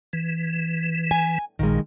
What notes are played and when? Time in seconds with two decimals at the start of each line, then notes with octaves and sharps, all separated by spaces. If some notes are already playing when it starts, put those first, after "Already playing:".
0.13 E3
1.11 G#5
1.59 A#1 A#2 D#3 G#3